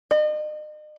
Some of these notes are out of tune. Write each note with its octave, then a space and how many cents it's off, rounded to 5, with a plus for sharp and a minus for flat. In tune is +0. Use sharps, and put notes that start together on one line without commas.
D#5 -40